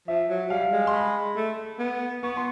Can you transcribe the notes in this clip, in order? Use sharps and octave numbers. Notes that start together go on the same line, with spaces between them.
F3 E5
F#3
G3 F5
G#3
C6
B5
A3
B3
B3 C#6
C6